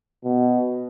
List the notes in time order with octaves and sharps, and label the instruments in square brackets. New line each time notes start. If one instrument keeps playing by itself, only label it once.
[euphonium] B2